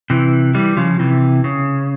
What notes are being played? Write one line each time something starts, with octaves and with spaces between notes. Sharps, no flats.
C3 E3
E3 G3
C#3 F3
C3 E3
C#3